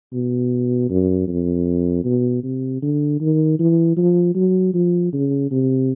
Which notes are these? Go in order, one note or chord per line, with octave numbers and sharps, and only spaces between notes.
B2
F#2
F2
B2
C3
D3
D#3
E3
F3
F#3
F3
C#3
C3